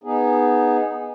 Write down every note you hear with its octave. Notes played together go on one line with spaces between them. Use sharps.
B3 D#4 G#4